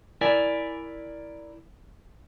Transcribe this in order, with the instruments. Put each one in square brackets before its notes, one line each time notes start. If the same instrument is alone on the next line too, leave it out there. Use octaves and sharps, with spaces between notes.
[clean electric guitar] E4 A#4 D5 G#5